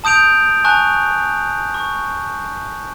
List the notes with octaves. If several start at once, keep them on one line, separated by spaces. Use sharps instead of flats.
A5 D#6 G6 D7 F7
G#5 A5 C#6 F#6 F7
C#6